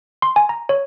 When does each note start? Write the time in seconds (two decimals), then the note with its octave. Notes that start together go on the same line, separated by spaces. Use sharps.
0.22 C6
0.36 G#5
0.49 A#5
0.69 C#5